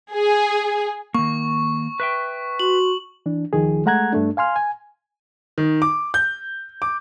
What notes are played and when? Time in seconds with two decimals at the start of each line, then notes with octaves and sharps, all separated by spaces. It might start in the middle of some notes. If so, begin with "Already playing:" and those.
0.13 G#4
1.15 D#3 A#3 C#6
2.00 B4 E5 G5
2.59 F#4 C6 C#6 F#7
3.26 E3 D4
3.53 C#2 D#3 F3 G#4
3.86 G#3 A3 F#5 A#5 F#6 G#6
4.13 G2 A3 D4
4.37 F5 G#5 C6 F6
4.56 G#5
5.58 D#3
5.82 D6
6.14 G6
6.82 D6